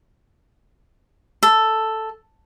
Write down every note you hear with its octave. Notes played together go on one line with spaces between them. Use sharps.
A4